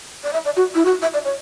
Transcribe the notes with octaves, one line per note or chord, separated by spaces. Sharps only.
D5
E5
D5
F#4
E4
F#4
E5
D5
C#5